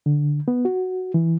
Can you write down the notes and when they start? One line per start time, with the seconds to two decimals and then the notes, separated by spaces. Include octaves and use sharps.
0.06 D3
0.48 B3
0.65 F#4
1.14 E3